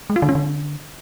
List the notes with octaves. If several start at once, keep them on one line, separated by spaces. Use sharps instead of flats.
G#3
F4
D3
C#4
D3